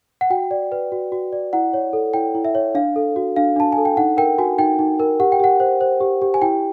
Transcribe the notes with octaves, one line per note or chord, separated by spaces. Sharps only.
F#5
F#4 G5
D5
B4
F#4
F#4
D5
E4 F#5
C#5
A4
E4 G5
E4
E5
C#5
D4 F5
A4
F#4
D4 F5
D4 A5
G#5
A4
G5
D#4 F#5
A#4 G5
F#4 G#5
D#4 G5
D#4
A#4
G4 F#5
G5
G4 F#5
C5
C5
G4
G4
G#5
E4 G5